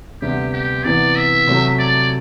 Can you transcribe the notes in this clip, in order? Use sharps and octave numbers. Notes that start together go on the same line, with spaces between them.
D2 C3 G3 B3 G4
G4
C3 E3 B3 D5
E5
C3 F#3 A3
D5